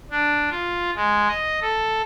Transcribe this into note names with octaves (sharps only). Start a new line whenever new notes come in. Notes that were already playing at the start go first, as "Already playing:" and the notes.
D4
F4
G#3
D#5
A4